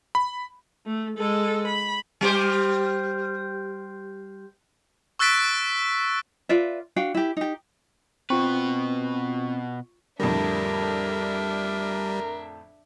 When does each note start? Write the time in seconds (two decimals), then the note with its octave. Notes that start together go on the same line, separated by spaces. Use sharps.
0.15 B5
0.86 A3
1.18 G#3 A4
1.68 B5
2.21 G3 G4 C5
5.19 C#6 E6 F#6 A6 B6 D7
6.49 F4 B4 D5 E5
6.96 D4 F#4 F5 G5
7.14 E4 G4
7.37 D#4 G4
8.30 B2 C4 F4 B4 C#6
10.20 F2 A2 D3 G3 D4 A#4 E5